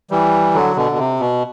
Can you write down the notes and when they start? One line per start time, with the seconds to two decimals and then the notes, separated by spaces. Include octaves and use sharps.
0.11 E3 G3
0.54 D3 F#3
0.76 B2 D3
0.92 B2
0.98 C3
1.20 B2